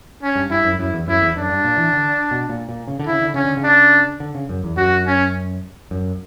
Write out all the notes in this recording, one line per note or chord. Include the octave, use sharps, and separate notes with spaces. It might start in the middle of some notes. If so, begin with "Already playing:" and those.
C#4
G2
G2 E4
F#2
F#2 E4
E2
F#2 E4
E2
F#2 D4
G2
A#2
E3
D3
B2
A#2
A#2
C#3
D3
C#3 E4
D3
C#3 C#4
D3
C#3
D4
D3
C#3
F#2
E2
F#2 F#4
C#4
F#2